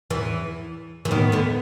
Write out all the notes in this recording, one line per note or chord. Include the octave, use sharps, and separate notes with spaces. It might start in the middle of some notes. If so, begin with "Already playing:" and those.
E2 E3
E3
D#2 D#3 B3
D2 D3